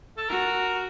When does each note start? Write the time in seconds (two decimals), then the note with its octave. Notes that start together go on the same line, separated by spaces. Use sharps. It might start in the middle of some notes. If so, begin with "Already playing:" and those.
0.17 A4
0.29 F#4 A#4